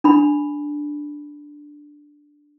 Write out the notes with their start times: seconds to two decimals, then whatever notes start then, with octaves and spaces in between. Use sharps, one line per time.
0.04 D4 B5